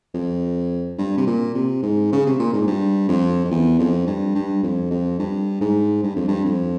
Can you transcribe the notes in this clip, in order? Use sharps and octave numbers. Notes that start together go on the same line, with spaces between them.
F2
G2
C3
A#2
C3
G#2
C#3
C3
A#2
G#2
G2
F2
F2
E2
F2
G2
G2
F2
F2
G2
G#2
G2
F2
G2
F2